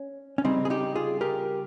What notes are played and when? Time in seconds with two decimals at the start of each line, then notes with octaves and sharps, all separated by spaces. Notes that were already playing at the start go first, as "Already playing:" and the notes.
Already playing: C#4
0.38 C#4
0.45 C#3 G3 C4 D#4
0.65 G#4
0.70 D#4 G4
0.95 F4 G#4
1.21 G4 A#4